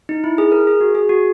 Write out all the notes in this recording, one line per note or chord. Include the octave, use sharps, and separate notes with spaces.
D#4
E4
G#4
A#4
G#4
F#4
G#4
F#4